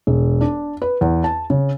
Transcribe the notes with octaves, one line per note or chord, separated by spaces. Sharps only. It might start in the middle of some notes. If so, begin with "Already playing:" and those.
E1
D4
B4
E2
A5
C#3